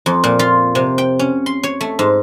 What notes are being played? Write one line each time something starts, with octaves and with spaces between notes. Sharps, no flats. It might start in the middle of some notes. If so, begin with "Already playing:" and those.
F2
A#2
F4
C3
G5
C#4
C6
C#5
A3
G#2